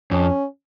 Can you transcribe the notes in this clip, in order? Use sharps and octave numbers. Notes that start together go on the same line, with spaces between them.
F2 C#4